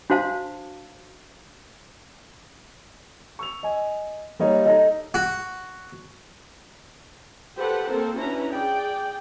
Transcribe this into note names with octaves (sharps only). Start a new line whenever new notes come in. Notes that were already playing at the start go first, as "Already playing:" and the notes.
D4 F#4 C5 F5 A5
C#6 E6 F7
D#5 G#5
G3 A#3 D#4 C#5
D#4 A4 D#5 A#5
F#4
G4 A4 B4 C5 F#5
A#3 C4 A4 A#4 C5
C#4 D4 E4 F#4 B4 A#5
G#4 D5 G5